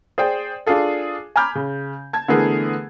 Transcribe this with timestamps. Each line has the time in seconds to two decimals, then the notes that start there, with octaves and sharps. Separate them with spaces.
0.18 G#4 C5 D5 G5
0.66 D4 F4 G#4 A4
1.36 G#5 A#5 B5 D6 F6 G6
1.55 C#3
2.13 A5 G#6
2.28 D3 E3 A3 B3 G#4 A#4